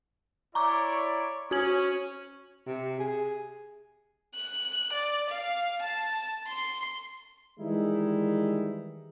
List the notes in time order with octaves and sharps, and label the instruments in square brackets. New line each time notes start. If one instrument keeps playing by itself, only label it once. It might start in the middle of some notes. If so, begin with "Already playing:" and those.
[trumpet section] E4 C#5 D5 [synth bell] A#5 C#6 D6
[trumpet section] C#4 [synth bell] F#4 G#6 F#7
[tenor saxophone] C3
G#4
[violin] F#6
D5
F5
A5
C6
[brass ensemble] D#3 E3 G3 G#3 D#4 E4